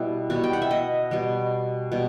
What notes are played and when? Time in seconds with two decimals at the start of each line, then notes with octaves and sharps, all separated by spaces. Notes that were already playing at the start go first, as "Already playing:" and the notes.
Already playing: B2 G3 B3 E4
0.30 B2 G3 B3 F#4
0.44 G5
0.53 F#5
0.62 E5
0.71 D#5
1.11 B2 G3 B3
1.92 B2 G3